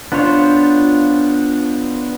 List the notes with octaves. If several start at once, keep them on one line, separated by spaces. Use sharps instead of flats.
B3 D4 F4 C5 C#5